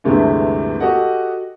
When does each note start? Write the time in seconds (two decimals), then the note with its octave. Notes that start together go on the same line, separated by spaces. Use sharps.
0.04 D2 G2 C3 E3 G#3 A3
0.80 F#4 G4 A4 D#5 F#5